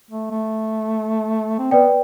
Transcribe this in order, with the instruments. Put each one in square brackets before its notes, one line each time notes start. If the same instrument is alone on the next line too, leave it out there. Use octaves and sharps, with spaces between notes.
[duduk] A3
A3
C4
[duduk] B3 [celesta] B4 D5 G5